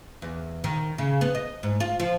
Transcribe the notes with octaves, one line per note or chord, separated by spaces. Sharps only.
E2
D#3
C#3
B3
D#5
G#2
F4
F3